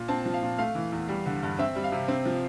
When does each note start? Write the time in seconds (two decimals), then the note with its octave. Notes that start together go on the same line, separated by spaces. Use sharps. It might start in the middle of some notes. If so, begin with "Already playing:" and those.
Already playing: A#2
0.08 C4 A5
0.25 F3
0.34 F5
0.43 A#2
0.59 A3 F5
0.75 E3
0.92 E2
1.09 G3
1.26 D3
1.43 G2
1.59 C4 E5
1.76 G3
1.84 F5
1.92 C3
2.08 C4
2.26 F3